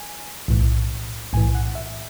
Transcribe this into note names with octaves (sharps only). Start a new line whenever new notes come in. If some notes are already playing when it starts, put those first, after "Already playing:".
Already playing: G#5
B1 A2 E3
B1 A2 E3 G#5
F#5
E5